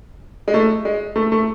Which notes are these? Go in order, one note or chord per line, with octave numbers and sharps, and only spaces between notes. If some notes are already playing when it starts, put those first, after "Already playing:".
G#3
A3
G#3
A3
A3